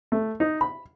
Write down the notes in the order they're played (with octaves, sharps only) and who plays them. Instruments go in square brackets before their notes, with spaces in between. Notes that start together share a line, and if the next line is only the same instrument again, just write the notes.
[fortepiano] A3
D#4
B5